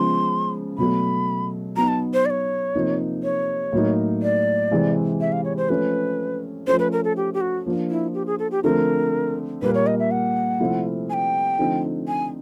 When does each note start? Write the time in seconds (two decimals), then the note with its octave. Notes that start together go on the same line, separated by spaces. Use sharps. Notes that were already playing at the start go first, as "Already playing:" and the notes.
Already playing: C#3 F3 G#3 B3 C6
0.78 B2 F#3 A3 B5
1.76 F#3 B3 D#4 A#5
1.88 A5
2.13 C5
2.26 D5
2.30 C#5
2.75 C3 F3 A#3 D#4
3.23 C#5
3.73 A2 F#3 A#3 D#4
4.23 D5
4.71 C3 E3 G#3 C4
5.21 E5
5.32 F5
5.45 C#5
5.57 C5
5.69 F3 A3 C#4 B4
6.67 F3 A3 C#4 C5
6.79 B4
6.92 A#4
7.04 A4
7.17 G4
7.34 G4
7.41 F#4
7.66 F3 A#3 D4 F4
7.90 E4
8.14 G4
8.27 G#4
8.39 A4
8.51 G4
8.64 D3 F3 A3 C4 A#4
9.62 A#2 G3 A#3 B4
9.75 C#5
9.87 D#5
9.99 E5
10.11 F#5
10.60 C3 F3 A3 C4 E4
11.10 G#5
11.14 G5
11.58 D3 F3 A3 C4 D#4
12.08 G#5